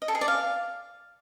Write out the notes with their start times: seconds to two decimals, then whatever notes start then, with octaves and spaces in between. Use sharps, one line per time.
0.02 D#5
0.08 A4
0.15 G#4
0.21 D5
0.28 F5